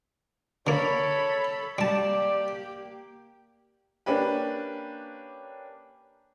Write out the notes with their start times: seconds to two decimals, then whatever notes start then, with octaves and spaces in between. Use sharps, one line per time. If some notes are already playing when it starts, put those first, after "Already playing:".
0.67 D3 A#3 A4 C#5 B5
1.78 G3 A#3 G4 D5 A5
4.06 A#3 C#4 D4 G4 B4